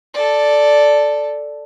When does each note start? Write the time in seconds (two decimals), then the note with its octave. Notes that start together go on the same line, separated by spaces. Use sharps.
0.14 A4 D5